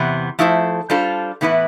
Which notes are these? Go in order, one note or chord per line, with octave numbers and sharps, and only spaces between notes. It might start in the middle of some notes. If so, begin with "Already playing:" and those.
Already playing: E2 C3 E3 B3
F3 A3 E4 A4 C5
G3 D4 F4 A4 C5
A2 E3 B3 E4 B4